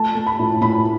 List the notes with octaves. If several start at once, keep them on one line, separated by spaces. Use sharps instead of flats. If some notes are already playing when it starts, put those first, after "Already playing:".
Already playing: A3 A5
A3
B5
A2
A2 B5